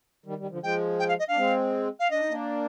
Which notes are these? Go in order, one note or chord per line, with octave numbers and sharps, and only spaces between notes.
D#3 G3
D#3 G3
D3 F3
F3 G#3 G5
G5
F5
D#5
D4 F5
G#3 C4
F5
D4 D#5
D#4
A#3 D4